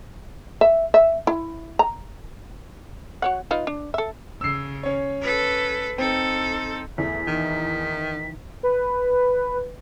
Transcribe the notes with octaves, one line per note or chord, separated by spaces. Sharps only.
E5
E5
E4
A#5
F#4 C#5 F#5
D#4 F4 B4
D4
A4 E5
C#3 E6 C7
C#4 C#5
A4 B4
C4 D#4 A4
E2 A3 B6
D#3 E3 D#4 E4
B4